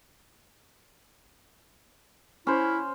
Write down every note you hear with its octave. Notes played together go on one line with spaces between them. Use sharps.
C#4 E4 C5